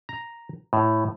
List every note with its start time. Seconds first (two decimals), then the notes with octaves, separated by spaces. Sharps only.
0.09 A#5
0.73 A2